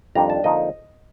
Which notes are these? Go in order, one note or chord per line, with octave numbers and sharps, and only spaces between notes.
F2 D#3 G3 D4 A#5
A5
F2 D3 F3 A#3 D#4 D#5